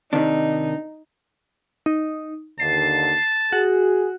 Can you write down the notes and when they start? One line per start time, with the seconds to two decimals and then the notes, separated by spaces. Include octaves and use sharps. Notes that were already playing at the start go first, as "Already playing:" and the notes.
0.13 C3 D#3 D4 D#4
1.86 D#4
2.60 D#2 D3 A5 C7
3.52 F#4 G#4